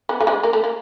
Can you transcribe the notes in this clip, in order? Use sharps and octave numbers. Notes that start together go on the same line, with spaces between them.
B3
A3
G#3
A#3
A3
A#3